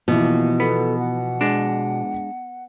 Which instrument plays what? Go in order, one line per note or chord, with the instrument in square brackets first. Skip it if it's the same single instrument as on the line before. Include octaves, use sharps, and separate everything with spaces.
[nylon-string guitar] B2 [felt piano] E3 F3 [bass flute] A#3
[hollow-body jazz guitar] B3 [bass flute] A4
[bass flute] F#5
[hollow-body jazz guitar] G#3 D4